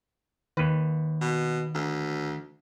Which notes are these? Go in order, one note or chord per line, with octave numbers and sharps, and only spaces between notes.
D#2 D#3 B4
B2
D2